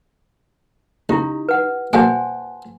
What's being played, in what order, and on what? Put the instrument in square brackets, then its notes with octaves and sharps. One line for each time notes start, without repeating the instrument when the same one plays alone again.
[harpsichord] C#2 [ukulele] D#4 [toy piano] E4 G4
[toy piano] B4 F#5
[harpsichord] B2 G3 A#3 [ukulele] C5 F#5 A5 [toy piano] G#5